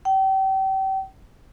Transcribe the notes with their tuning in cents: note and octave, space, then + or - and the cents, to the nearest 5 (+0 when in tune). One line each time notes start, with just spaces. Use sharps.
G5 -35